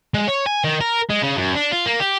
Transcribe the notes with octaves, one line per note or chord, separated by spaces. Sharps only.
G#3
C#5
G#5
D#3
A#4
G#3
C#3
F#2
D4
F4
A#3
G4